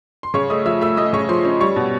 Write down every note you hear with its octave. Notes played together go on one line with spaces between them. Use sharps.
C6
C#3 C#5 C#6
A3 D#5 D#6
F3 E5 E6
A3 E5 E6
A3 D#5 D#6
C#3 C#5 C#6
F3 C5 C6
C#4
G3 C#5 C#6
B2